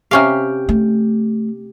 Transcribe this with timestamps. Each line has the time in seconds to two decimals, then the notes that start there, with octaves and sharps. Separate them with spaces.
0.11 C3 C#4 G4 F5 F6
0.69 A3